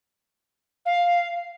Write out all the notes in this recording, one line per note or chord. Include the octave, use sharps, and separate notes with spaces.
F5